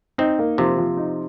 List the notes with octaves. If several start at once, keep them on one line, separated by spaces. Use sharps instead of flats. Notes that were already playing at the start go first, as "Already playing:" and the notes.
C4 D#4
A#3
C3 F3
F3
D#4